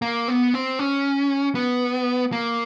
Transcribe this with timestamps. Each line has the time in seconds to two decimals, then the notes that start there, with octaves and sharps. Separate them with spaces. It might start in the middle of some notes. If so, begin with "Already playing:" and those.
0.02 A#3
0.28 B3
0.54 C4
0.79 C#4
1.55 B3
2.32 A#3